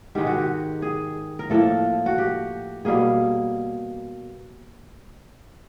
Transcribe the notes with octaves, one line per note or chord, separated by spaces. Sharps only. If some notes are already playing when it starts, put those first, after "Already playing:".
G#2 D#3 G#3 G4
F#4
G4
G#4
A#4
A2 F3 A#3 A4
F#4
G4
B2 G3 A#3 G#4